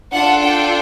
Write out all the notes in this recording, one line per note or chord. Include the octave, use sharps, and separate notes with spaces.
D4 F4 A4 F#5
G5